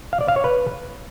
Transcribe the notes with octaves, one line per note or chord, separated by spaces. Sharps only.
F5
D5
F5
C#5
B4